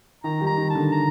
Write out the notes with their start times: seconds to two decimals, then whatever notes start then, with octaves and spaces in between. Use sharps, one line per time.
0.24 D#3 A#5
0.41 D#3 G3
0.47 A#5
0.58 D#3
0.70 A5
0.75 D3
0.92 A#5